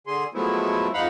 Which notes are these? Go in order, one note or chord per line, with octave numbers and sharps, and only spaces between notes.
D3 G#4 C6
F3 F#3 G#3 A3 B3 E4
F2 G#2 D#4 F5 F#5 B5